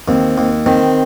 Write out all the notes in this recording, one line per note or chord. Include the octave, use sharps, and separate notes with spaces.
D#2 C4
D#2
D#3 C4